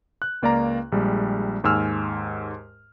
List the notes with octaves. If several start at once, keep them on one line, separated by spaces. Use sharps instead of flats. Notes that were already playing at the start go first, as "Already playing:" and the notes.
F#6
C#2 A#3 D5 F5 A#5
A#1 G3 G#3
D#2 G#2 G#5 E6 F6